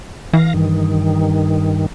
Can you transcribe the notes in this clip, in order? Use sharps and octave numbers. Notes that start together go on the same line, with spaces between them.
E3 F5 A#6
G2 D#3